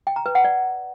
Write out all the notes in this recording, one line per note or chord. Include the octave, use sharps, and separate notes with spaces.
G5
A#5
B4
F#5
D5